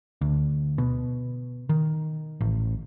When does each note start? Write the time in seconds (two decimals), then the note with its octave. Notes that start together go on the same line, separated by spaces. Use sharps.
0.21 D2
0.78 B2
1.69 D#3
2.41 A1